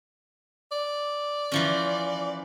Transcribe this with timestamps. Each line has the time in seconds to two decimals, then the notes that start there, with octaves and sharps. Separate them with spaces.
0.72 D5
1.52 E3 F3 C#4